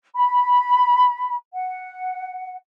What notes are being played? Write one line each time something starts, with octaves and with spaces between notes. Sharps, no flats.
B5
F#5